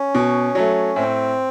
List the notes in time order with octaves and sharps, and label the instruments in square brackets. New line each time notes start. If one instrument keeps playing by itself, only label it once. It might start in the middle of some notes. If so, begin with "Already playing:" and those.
Already playing: [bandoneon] C#4
[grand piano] B2
F#3 A3
[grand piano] A2 [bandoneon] C4